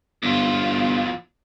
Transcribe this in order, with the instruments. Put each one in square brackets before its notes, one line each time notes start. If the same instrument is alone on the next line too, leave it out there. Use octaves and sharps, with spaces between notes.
[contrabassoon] G1 [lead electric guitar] E2 F4